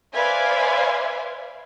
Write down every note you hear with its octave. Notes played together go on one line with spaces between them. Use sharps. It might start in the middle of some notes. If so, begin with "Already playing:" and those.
B4 C5 D5 E5 F5 G#5